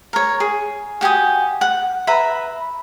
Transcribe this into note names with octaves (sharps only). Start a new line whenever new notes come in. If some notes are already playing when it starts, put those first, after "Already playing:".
A#4 C#5
G#4
F#4 G4 G#5 D#6
F#5
B4 E5 A#5 B5